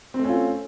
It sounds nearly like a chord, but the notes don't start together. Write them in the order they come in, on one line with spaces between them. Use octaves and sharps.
C4 A3 C#4 F4